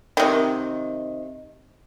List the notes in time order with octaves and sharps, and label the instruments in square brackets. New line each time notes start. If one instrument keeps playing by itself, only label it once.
[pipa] C3 D#3